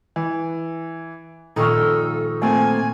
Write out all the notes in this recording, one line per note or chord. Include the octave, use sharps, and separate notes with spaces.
E3
A#2 D#3 F3 D#4 A4 C#6 F6
A3 A#3 C4 G#5